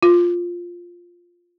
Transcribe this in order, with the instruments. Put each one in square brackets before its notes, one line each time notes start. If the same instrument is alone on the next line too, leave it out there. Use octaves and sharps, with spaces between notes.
[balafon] F4